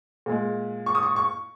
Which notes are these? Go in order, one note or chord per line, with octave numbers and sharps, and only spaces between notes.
A#2 G#3
C#6
D#6
C#6
C#6